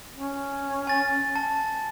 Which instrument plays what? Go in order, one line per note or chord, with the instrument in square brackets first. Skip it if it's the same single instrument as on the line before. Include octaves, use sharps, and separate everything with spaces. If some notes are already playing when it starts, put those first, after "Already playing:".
[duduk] C#4
[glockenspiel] G#5 A6
A5